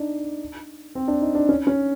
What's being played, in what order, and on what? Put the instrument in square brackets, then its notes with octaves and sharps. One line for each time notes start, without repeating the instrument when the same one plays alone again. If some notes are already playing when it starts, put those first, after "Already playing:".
Already playing: [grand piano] D4 D#4
C4
D4
D#4
D4
C#4
C#4